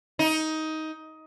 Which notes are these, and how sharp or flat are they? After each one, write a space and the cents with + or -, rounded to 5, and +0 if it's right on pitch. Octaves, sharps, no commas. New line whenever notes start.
D#4 +15